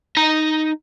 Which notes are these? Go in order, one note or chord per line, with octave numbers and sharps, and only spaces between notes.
D#4 A#5